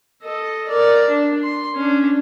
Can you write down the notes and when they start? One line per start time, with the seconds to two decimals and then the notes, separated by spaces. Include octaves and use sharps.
0.23 A4 D#5
0.68 A#4 D5
1.09 D4
1.43 C6
1.75 C#4 D4